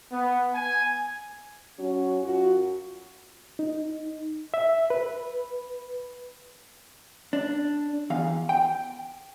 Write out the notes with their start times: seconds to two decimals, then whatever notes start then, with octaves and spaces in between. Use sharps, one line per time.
0.11 B3
0.54 G#5
1.78 F#3 C#4 F#4
2.22 F#2 F4 F#4
3.59 D#4
4.54 E5
4.90 B4
7.33 D4
8.10 E2 F5
8.49 G5